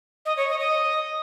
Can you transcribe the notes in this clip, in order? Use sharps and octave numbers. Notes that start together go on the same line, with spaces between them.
D#5
C#5
D#5
D#5